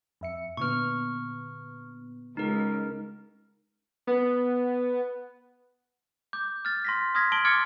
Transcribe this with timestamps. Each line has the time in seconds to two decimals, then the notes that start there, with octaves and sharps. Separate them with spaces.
0.21 F2 E5 C#7
0.57 A#2 D3 B3 C#6 F6
2.37 C#2 D#4 A#4
4.07 B3
6.33 D6 G6
6.65 F6 A6
6.85 C6 A#6 B6
7.15 C6 D#6 F6 G#6 A#6 B6
7.32 A5 D7 F#7 G7
7.45 C6 D6 F6 G#6 A6 C#7